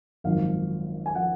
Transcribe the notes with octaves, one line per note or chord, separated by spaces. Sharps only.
G#1 F#2 F3 F5
G#5
F3 F#5